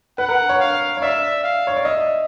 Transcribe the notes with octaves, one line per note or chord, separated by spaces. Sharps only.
B4 F#5
A#4
C#5
F5
C#5
D5 E5
F5
C#5
D5
D#5 E5